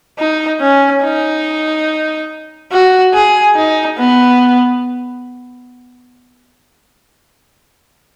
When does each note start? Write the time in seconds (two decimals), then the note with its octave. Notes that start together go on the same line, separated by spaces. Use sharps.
0.19 D#4
0.60 C#4
1.03 D#4
2.71 F#4
3.13 G#4
3.55 D#4
3.98 B3